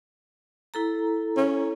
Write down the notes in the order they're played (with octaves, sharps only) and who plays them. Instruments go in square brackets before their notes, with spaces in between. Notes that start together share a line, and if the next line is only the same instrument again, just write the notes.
[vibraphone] E4 A4 A#5
[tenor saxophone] C#4